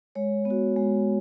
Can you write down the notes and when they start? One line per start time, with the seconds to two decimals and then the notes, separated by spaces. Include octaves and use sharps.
0.15 G#3 C#5
0.45 B3
0.50 F#4
0.76 G#3